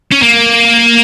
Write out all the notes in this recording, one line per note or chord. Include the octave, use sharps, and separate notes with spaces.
C#4
A#3